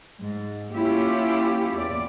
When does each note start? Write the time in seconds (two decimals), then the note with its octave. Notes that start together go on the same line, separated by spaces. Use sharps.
0.21 G#2
0.76 A#3 C#4 E4 F4 G4
1.75 E2 D5